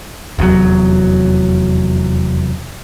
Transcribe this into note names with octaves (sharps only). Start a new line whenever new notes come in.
F1 E2 A#2 F#3